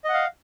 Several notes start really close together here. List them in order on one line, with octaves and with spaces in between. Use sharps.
D#5 F#5 F5